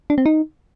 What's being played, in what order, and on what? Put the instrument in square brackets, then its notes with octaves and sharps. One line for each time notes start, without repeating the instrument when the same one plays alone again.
[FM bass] D4
C4
D#4